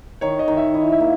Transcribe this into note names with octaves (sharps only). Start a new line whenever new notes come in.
D#3 C#5
D#5
D#3
E5
E4 D#5
E5
A#3